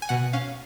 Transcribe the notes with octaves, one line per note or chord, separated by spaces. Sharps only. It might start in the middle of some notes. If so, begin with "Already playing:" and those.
G#5
B2 F#5
C#4 F5